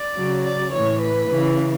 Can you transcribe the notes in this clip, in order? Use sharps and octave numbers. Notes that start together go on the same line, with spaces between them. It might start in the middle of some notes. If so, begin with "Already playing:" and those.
Already playing: D5
C#3 F#3
D5
A2 E3 C#5
B4
C#3 E3